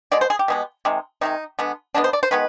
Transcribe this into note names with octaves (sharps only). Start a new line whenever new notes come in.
B2 G#3 D5
C5
G#4
G4
B2 G#3 B3
C3 D#3 G#3
C3 D#3 G#3 D#4
D3 G#3 B3
D3 G#3 B3 D4
C5
D5
C5
D#3 G#3 B3 B4